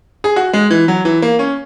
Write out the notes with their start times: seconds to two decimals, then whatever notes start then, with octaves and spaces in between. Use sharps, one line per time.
0.24 G#4
0.36 F#4
0.53 G#3
0.70 E3
0.88 F#3
1.05 E3
1.22 A#3
1.39 C#4